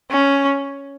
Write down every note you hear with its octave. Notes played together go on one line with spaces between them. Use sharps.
C#4